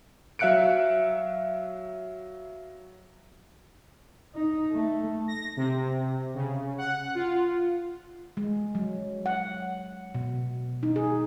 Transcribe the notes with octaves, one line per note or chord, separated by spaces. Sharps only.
F#3 E5 F5 F#6 C#7 D7
D#4
A3
A#6
C3
C#3
F#5
F4
G#3
F#3
F#5
B2
D#4
G#4